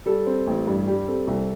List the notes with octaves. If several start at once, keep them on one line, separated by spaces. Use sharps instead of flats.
G3 A4
C4
A1
G2
G3 G4
C4 A4
C2 A4